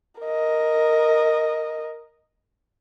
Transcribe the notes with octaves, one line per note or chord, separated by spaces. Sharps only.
A#4 D#5